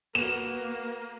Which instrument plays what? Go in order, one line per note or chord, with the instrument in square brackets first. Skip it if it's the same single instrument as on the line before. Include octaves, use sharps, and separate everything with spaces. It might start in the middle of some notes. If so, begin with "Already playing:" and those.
[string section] A#3 [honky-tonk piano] B3 F#4 [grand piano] E7